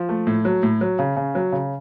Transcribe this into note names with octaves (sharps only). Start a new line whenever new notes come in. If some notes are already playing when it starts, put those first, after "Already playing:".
Already playing: F3
A3
A2
F#3
A2
F#3
C#3
C#3
F#3
C#3